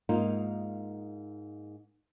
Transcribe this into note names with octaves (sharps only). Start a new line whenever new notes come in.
G#2 A#3 D#4 F4